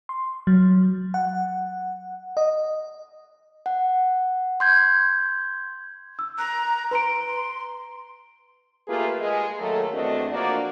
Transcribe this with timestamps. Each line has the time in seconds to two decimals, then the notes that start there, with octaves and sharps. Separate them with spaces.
0.09 C6
0.47 F#3
1.14 F#5
2.37 D#5
3.66 F#5
4.60 C6 G6 G#6
6.19 E6
6.38 A#5 F#6
6.91 B4 A#5 C6 D7
8.88 A3 A#3 F4 G4 G#4 B4
9.20 G#3
9.59 D#3 F#3 A3 A#3 A4
9.93 E2 A3 C4 D4 F#4 D#5
10.32 F3 A#3 D4 F#4 D5